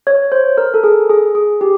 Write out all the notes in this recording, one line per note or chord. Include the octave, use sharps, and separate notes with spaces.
C#5
C5
A#4
A4
G#4
G#4
G#4
G4